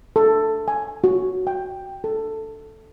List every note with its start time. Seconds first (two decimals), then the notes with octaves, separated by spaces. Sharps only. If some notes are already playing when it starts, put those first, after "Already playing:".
0.16 A4
0.68 G#5
1.04 F#4
1.47 G5
2.04 A4